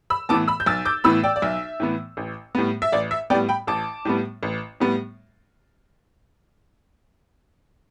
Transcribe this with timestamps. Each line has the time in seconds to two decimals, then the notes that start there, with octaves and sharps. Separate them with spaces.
0.10 B5 E6
0.29 A2 E3 B3 A5 D6
0.48 B5 E6
0.60 G6
0.66 B1 E6 A6
0.85 D6 G6
1.04 A2 E3 B3 B5 E6
1.24 D5 G5
1.36 D5
1.42 B1 E5
1.80 A2 E3 B3
2.17 A1
2.55 A2 G3 B3
2.82 E5
2.92 A1 D5
3.11 E5
3.30 A2 G3 B3 D5 G5
3.49 G5 B5
3.67 A1 A5 D6
4.05 A2 G3 B3
4.43 A1
4.80 A2 G3 B3